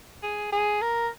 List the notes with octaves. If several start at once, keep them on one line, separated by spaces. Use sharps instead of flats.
G#4
G#4
A#4